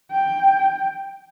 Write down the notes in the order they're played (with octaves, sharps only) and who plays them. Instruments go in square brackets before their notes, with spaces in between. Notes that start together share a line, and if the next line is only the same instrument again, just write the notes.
[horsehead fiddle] G5